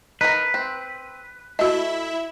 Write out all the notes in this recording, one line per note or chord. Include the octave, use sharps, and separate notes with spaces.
D#4 A#4 B4
C4
A3 E4 F#4 D#5 E5